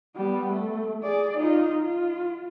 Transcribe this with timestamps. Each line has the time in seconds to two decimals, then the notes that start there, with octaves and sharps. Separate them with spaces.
0.16 G3 B3
0.52 A3
1.04 G#4 D5
1.37 D#4 F4
1.82 F4